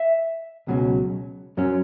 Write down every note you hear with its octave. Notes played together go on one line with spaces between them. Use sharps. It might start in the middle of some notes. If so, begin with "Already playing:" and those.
Already playing: E5
C#2 B2 F#3 C#4
F#2 F#3 C#4